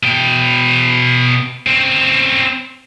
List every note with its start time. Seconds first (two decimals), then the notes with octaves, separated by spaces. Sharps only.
0.03 B2 G5
1.67 C4 C#4